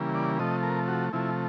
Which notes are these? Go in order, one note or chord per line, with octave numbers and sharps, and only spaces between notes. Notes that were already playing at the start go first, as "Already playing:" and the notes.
Already playing: C#3 E3 G3 A#3
D5
C3 F3 A3 D#5
A#4
F#4
C3 F3 A3 E4